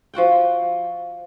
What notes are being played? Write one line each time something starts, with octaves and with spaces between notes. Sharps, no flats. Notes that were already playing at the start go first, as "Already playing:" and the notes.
F3 F#4 F#5 G5